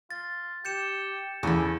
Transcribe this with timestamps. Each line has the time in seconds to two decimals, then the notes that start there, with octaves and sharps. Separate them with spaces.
0.11 F4 A6
0.65 G4 G6 C#7 E7
1.43 E2 C#3 E3 A4